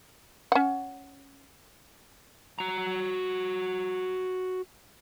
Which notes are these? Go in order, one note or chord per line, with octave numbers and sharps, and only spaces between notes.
C#4 F#5
F#4 A#5